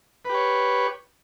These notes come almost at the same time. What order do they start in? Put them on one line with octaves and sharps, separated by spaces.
B4 G4 C#5